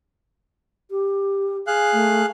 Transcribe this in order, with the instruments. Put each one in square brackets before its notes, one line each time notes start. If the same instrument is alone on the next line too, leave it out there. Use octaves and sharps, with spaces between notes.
[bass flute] G4
[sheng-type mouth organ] G#4 F5 F#6
[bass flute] A3